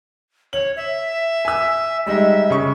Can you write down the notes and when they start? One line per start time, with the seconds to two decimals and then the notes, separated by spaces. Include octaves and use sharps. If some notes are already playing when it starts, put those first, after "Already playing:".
0.53 C#5 F#7
0.76 E5
1.45 G#5 E6
2.06 G3 G#3 D#4 E5
2.50 C#3 C#6